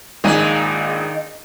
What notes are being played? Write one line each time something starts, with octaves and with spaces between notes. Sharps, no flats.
A#1 G#2 D#3 D5 G#5